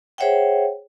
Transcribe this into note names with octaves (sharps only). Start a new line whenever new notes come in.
G#4 C5 C#5 E5 F#5 G5